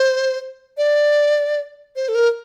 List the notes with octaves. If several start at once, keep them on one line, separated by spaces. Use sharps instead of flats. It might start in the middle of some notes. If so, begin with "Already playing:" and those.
Already playing: C5
D5
C5
A4
A#4